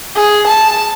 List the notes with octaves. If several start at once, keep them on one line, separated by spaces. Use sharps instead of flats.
G#4
A5